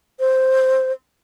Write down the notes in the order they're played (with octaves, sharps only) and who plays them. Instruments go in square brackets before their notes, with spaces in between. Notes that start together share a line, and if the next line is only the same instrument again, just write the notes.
[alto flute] C5